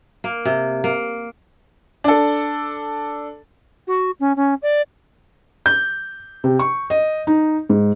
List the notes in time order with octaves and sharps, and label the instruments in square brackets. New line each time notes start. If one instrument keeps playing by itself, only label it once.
[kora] A#3
C3
A#3
[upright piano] D4 A4
[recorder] F#4
C#4
C#4
D5
[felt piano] G6
C3
C#6
D#5
D#4
G#2